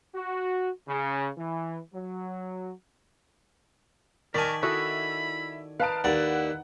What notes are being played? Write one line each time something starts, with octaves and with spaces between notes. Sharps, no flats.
F#4
C#3
E3
F#3
D#3 A#4 D5 G#5 A5 C#6 B6
E4 F#4 A4 D#5 B5
D#4 B4 F5 A5 D7
D#2 E4 D5 F#5